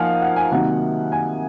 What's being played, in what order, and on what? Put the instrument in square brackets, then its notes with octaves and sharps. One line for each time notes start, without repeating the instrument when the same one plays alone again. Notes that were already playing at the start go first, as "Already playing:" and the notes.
Already playing: [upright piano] F3 A#3 D#4 F5 F#5 G#5
F#5
G#5
C3 D#3 F#3 A#3 D#4 F#5
G#5